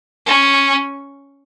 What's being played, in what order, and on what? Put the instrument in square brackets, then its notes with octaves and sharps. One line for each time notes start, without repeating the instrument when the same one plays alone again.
[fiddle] C#4